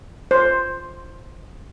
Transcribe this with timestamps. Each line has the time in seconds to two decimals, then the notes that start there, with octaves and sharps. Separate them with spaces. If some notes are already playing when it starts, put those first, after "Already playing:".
0.31 C5